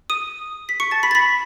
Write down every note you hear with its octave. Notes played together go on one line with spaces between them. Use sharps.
D#6 D#7
B6
C#6 C#7
A5 A6
B5 B6
A6
B5 B6